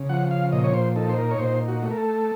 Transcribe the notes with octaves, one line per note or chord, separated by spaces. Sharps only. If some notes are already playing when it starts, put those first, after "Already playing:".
Already playing: C#3
F3 F#5
F5
A#2 D#5
C#5
C5
D#4 A4
C5
A#4
C#5
A#2 C5
F#4
A3
A#4
A4